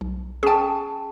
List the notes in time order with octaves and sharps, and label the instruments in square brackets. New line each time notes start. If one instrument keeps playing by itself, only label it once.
[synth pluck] B1
[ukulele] C#4 A5 [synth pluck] G#4 G5